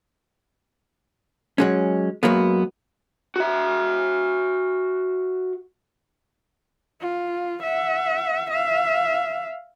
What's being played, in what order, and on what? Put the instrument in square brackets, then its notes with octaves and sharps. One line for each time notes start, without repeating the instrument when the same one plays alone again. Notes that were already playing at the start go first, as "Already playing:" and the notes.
[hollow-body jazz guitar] F#3 G#3 C#4
F#2 F#3 G#3 A#3 B3
[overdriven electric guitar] F#4 E5
[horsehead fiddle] F4
E5 F#5
E5 F5